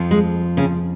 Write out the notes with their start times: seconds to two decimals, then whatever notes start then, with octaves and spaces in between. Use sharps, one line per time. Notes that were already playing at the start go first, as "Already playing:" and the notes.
Already playing: F2 F3
0.11 G#3
0.57 C#3 C#4